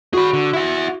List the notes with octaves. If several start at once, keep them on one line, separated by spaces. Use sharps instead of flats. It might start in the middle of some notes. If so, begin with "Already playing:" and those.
F#4 G#4 B5
D3
E4 F#5